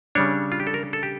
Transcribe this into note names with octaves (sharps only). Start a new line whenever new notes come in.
C#3 G3 D4 C#5
F4
G4
A4
A#4
A4
G4